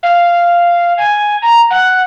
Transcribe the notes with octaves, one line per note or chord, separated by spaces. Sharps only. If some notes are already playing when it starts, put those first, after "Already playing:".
F5
G#5
A#5
F#5